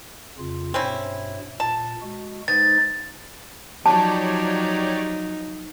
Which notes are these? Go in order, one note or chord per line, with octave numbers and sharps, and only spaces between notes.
F2 C#3 F4
G2 B2 C4 C#4 E4
A#2 A5
G#3 F#4
G#3 B3 D#4 C5 A6
F3 F#3 D#4 G4 C#5 D5 A5